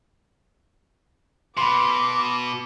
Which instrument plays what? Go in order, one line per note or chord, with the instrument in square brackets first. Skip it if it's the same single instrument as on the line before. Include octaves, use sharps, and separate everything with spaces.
[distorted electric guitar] B2 [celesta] B5 C6 [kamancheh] D6